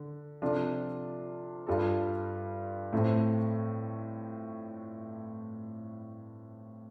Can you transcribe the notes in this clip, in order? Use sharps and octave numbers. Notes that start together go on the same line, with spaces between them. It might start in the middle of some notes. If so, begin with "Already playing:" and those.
Already playing: D3
C3 F3 D4 F4 A4
G2 G3 F4 A4
A2 A3 C4 A4